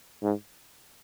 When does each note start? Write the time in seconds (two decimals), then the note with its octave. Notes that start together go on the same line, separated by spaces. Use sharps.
0.23 G#2